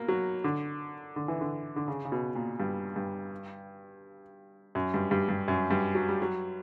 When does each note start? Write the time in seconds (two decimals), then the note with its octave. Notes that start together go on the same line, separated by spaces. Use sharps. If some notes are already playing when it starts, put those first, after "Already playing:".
Already playing: B2 A#3
0.08 F#3
0.44 D3
1.16 D3
1.28 E3
1.41 D3
1.76 D3
1.88 C#3
2.05 C#3
2.12 B2
2.35 A#2
2.60 G2
2.96 G2
4.75 F#2
4.94 G2
5.11 G2
5.29 G2
5.48 F#2
5.71 G2
5.95 F#3
6.09 G3
6.22 F#3